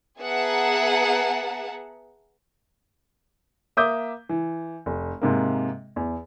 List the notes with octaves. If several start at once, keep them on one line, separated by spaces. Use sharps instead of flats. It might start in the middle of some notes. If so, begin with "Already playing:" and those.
B3 G#4 E5 F#5 A5 A#5
A#3 E5 D6 D#6 G6
E3
F1
G#2 C3 A#3
E2